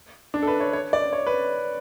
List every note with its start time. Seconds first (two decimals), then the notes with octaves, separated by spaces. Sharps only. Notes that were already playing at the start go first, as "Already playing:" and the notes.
0.34 D4
0.42 A4
0.47 B4
0.60 C#5
0.73 C#5
0.93 D5
1.13 C#5
1.26 B4